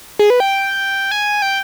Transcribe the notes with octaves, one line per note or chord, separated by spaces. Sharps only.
G#4
B4
G5
G#5
G5